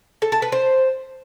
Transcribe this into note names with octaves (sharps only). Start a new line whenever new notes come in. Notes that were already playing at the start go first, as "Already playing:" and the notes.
A4
A5
B4
C5